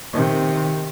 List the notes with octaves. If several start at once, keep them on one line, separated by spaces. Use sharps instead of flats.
C3 D#3